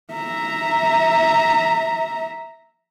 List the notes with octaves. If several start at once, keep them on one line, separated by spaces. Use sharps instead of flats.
E5 A#5